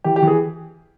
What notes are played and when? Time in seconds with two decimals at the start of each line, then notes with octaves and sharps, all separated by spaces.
0.04 E3 G4
0.16 G4
0.22 E3
0.27 G#4